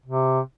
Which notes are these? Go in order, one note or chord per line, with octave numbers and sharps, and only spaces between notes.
C3